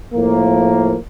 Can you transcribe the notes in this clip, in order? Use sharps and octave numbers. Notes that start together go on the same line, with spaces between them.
A2 F3 A#3